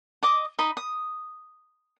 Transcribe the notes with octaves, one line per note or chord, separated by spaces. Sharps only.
D#5 D6 D#6
D#4 D#5 B5
D#6